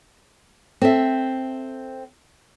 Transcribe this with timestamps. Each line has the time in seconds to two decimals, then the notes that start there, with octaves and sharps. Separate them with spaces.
0.82 C4 A4 C5 E5